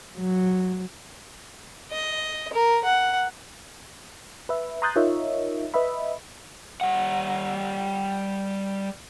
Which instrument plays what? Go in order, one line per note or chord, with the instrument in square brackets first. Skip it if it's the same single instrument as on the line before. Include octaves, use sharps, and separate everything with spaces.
[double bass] F#3
[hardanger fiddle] D#5
A#4
F#5
[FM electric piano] B4 E5
A#5 C6 D#6 F#6 G6 A6
D#4 F4 A#4 C#5 D#5 E5
B4 D#5 E5 B5
[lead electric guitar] G3 F#5